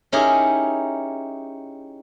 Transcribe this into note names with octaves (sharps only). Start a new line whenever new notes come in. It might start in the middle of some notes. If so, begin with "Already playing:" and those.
C#4 D#4 E4 G4 G#4 A#4